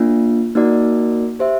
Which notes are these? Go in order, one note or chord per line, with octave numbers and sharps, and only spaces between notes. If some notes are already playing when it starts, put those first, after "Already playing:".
Already playing: A#3 D4 F4
A#3 D#4 F#4 A#4 D5
G4 C5 E5